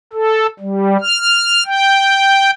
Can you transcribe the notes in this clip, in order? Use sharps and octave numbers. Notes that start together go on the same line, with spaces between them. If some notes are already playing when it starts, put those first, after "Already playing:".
A4
G3
F6
G5